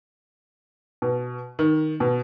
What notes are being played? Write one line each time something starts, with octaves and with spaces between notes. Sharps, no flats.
B2
D#3
B2